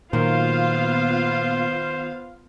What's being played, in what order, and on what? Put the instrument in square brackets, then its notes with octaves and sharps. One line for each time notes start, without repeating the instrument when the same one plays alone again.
[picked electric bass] A#2 [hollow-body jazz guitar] D#3 F#3 A#4 [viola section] B3 F4 F5 [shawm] C5